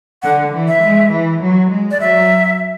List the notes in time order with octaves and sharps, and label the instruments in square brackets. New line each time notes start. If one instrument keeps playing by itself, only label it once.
[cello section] D3 [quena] F#5
[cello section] E3
[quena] E5
[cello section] G#3
E3
F#3
G#3
[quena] D5
[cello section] F#3 [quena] E5